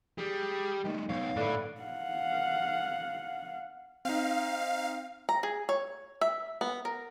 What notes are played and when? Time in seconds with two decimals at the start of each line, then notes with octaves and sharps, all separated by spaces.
0.18 G3 G#4
0.85 D#3 G3 A3
1.10 B1 C#5 F5
1.36 A2 D3 B4
1.82 F5 F#5
4.05 C4 D#4 F5
5.29 A#5
5.43 G#4
5.69 C#5
6.21 E5
6.61 B3
6.85 A#4